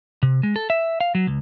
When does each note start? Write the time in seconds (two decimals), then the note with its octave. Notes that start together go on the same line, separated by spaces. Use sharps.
0.23 C3
0.43 G#3
0.56 A4
0.70 E5
1.01 F5
1.15 F#3
1.27 C#2